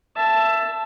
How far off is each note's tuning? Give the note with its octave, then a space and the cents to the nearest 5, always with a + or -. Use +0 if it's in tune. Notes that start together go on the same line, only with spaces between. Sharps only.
E5 +20 A5 +0